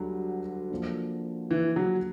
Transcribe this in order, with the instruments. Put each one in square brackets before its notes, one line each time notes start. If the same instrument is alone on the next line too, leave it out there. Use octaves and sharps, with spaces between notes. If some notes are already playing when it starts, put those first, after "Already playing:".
Already playing: [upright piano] D2 D3 G3 [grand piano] F#3
[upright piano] F3 A#3 D4
[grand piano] E3
F#3